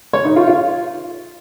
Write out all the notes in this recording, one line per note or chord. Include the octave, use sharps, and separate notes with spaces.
C#5
D#4
F4
F4